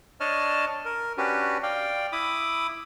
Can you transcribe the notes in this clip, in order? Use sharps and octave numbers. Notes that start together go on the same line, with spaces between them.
D4 C#5 D#5 A5 F6
A#4
C#4 D4 F#4 G4 B4
D5 F5 G5
E4 B5 D6 D#6